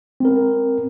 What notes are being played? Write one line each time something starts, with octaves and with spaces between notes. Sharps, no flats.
C4 A#4